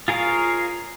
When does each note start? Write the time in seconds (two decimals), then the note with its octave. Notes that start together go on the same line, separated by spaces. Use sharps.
0.08 F4 G#4 A#4 C#5 F5